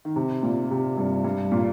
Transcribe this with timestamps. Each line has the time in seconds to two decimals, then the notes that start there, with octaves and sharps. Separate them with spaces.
0.05 D#3
0.16 C3
0.43 A#2
0.71 C3
0.97 G2
1.24 G2
1.52 A#2